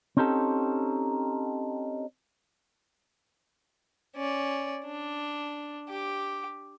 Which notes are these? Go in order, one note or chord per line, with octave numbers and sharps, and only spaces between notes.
C4 C#4 D#4 G4 A4
C#4 D5
D4
G4 D6